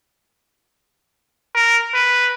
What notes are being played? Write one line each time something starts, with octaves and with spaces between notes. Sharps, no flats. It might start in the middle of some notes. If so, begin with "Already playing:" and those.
A#4
B4